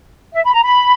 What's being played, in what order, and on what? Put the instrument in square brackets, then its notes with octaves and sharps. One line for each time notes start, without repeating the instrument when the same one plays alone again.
[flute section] E5
B5
A#5
B5